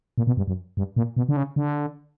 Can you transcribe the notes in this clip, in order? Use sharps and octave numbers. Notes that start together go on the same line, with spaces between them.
A#2
B2
G2
F#2
G2
A#2
B2
D3
C#3
D3